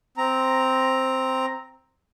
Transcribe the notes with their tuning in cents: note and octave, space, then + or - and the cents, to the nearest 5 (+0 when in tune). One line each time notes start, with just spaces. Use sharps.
C4 +0 A#5 +0